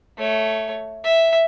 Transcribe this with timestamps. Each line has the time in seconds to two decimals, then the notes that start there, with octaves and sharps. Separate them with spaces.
0.18 A3 C#5
1.04 E5